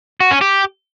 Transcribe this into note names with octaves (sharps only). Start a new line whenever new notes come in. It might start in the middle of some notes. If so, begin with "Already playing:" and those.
F#4
C#4
G4